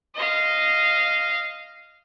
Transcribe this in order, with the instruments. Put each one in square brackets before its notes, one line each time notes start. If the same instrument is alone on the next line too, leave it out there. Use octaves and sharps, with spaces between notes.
[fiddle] D#5 F5